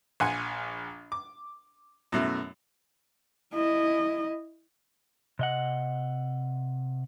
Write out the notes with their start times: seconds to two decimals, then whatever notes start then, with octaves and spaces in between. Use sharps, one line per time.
0.20 A#1 F#5 G#5 C6
1.12 D6
2.12 F#2 B2 A3 E4
3.53 E4 D#5
5.39 C3 D#5 F#5